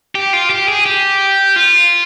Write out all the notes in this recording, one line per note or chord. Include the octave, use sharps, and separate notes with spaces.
G4
F4
G4
G#4
G4
F4